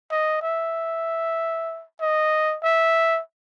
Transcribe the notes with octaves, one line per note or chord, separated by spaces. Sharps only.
D#5
E5
D#5
E5